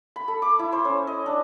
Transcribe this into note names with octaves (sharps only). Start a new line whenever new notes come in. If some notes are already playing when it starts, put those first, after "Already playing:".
B5
A4
D6
E4
C5
C#4
D#5
D4